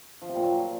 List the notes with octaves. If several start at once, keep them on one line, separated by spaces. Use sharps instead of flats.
F3
C3
A#2
F#3